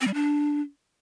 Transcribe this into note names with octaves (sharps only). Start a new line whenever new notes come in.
C4
G3
D4